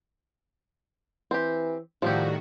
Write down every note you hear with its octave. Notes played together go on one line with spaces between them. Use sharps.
E3 C4 G4
A2 D#3 F3 G3 A3 F#4 G4